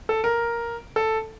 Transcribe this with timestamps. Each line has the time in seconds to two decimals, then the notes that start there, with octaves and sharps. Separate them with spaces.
0.09 A4
0.24 A#4
0.96 A4